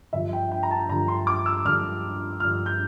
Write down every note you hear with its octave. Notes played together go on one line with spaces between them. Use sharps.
G2 D3 F3 E5
G5
G5
A#5
A5
G2 D3 F3 A#5
C6
D6
E6
G2 D3 F3 F6
G2 D3 F3 F6
G6